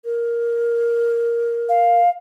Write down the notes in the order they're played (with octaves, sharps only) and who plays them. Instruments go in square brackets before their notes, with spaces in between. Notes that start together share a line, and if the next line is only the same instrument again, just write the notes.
[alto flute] A#4
[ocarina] F5